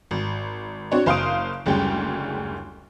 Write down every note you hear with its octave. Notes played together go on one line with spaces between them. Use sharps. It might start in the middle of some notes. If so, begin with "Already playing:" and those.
G#1
C4 D4 F#4 C#5 D5
F#1 C5 F5 C6 D#6 D7
F#1 D2 G3 G#3 C#4 G5